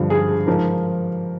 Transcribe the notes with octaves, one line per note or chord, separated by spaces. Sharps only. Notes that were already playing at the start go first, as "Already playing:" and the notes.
Already playing: G2 D3 F3
G#4
G#2 F3 A#4